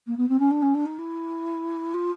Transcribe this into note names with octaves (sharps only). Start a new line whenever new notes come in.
A#3
B3
C4
C#4
D4
C#4
D4
D#4
E4
F4